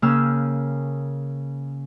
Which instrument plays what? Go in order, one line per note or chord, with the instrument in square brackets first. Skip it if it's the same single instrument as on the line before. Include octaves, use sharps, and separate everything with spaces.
[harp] C#3 A#3 C#4 G5 E6 F6